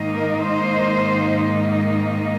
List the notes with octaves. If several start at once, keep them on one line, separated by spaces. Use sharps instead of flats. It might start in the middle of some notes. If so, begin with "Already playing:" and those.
Already playing: G#2 D#3 A#3 D#4
A#4
C5